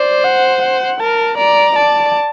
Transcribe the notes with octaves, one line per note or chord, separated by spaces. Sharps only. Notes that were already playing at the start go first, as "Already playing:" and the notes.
Already playing: C5 D5
F#5
F#5
A#4 A5
D5 A#5
D5 A5